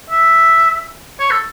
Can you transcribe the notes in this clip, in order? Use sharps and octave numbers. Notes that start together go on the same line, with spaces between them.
E5
C#5
A4